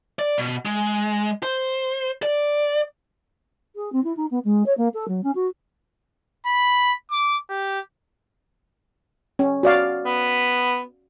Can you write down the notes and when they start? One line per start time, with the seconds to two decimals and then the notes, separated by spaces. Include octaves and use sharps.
0.19 D5
0.38 B2
0.65 G#3
1.43 C5
2.23 D5
3.76 G#4
3.92 C4
4.04 E4
4.17 D#4
4.31 B3
4.44 G#3
4.66 C#5
4.78 A#3
4.94 A4
5.08 F#3
5.23 C#4
5.35 F#4
6.46 B5
7.11 D6
7.49 G4
9.39 C#4
9.63 F#4 D5 F5
10.06 B3